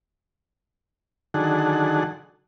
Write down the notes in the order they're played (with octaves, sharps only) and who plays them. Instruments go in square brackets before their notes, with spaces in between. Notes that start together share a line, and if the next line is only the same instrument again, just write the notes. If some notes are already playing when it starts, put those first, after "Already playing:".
[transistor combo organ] D3 D#3 F#3 G#4 A4 F#5